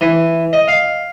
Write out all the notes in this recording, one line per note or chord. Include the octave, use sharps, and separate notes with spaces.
E3
D#5
F5